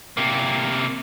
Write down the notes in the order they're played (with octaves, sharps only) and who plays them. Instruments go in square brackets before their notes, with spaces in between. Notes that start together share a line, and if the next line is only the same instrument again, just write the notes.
[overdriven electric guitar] C3 A#3